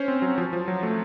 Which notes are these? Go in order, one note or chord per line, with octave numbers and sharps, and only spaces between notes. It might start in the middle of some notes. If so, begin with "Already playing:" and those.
Already playing: C#4 C5 C#5
C4
F#3
F3
F3
F#3
A3